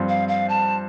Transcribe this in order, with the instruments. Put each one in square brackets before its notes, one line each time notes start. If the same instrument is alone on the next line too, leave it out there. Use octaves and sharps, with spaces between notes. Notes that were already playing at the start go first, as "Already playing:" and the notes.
Already playing: [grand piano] G2 F3 C4 F4
[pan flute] F5
F5
A5